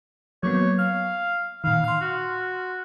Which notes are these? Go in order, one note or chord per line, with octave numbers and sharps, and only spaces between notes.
F#3 A#3 B3 C#5
F5 F6
A#2 D#3 F5
C6 F6
F#4